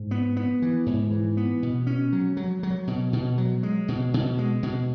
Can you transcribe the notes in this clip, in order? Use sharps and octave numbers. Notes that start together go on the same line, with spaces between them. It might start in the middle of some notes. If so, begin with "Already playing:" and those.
Already playing: G#2
B3
B3
E3
G#2
E3
B3
B2
C#4
F#3
F#3
F#3
B2
B2
F#3
G#3
B2
B2
G#3
B2